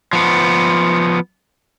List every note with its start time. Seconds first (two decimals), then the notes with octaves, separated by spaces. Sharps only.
0.13 F3 B3